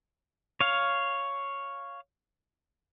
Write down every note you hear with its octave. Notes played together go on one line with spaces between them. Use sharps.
C#5 F5